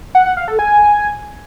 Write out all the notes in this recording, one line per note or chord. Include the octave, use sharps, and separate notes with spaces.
F#5
F#5
F5
A4
G#5